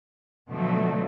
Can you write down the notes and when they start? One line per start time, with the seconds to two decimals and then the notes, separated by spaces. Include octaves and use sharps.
0.49 B2 D3 F3 F#3 A3